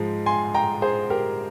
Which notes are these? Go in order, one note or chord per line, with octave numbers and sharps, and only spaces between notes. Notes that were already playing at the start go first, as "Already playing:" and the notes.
Already playing: G#2 F3 G#3
G#5 C6
G5 A#5
G#4 C5
G4 A#4